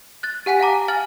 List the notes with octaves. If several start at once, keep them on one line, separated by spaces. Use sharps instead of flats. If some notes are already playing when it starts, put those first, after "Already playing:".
F#6 A6
G4 F#5 G#5 B6
F5 F#5 A5 A#5 D6
F5 G#5 F6 A6 F#7